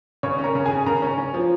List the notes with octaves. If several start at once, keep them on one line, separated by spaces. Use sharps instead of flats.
C#3 C#5 C#6
C#4
A#4 A#5
C#3
G#4 G#5
C#4
C#3 A#4 A#5
C#4
C#4
F3